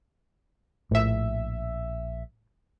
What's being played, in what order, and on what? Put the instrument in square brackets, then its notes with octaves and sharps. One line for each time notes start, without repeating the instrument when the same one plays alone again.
[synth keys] A#1 E5 [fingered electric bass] A2